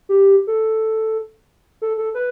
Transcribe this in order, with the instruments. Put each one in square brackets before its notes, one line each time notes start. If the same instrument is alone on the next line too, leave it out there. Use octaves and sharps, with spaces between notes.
[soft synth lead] G4
A4
A4
A4
B4